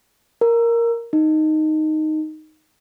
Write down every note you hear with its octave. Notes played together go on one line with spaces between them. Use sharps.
A#4
D#4